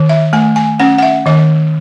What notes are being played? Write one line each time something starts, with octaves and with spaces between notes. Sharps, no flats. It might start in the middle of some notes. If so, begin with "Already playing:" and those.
Already playing: D#3
E5
A3 G#5
G#5
C#4 F#5
F#5
E5
D#3 D#5